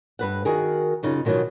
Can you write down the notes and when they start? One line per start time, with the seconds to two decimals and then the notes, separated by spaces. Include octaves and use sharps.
0.19 G2 B4 F#5
0.45 D#3 F#4 G#4 A#4
1.03 F#2 C#3 D#4 F4
1.25 B2 D#3 E3 F#3 D#4 F4